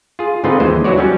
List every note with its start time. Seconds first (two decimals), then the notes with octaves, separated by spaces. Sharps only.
0.19 F4 G#4
0.44 G#2 D3 C4 F4 B4 D#5
0.60 D#2 E3 G#3 C5
0.84 D3 F#3 E4 F#4 C#5 D5
0.98 F#3 G3 C#4